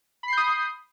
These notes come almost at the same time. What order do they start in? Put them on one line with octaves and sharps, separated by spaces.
B5 C7 G6 D#6